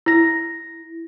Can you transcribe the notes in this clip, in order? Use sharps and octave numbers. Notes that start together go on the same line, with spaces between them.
E4 A#6